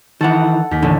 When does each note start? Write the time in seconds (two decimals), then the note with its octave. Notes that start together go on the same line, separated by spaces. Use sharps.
0.21 D#3 E3 A4 F#5
0.71 D#2 B6
0.82 A1 D3 A3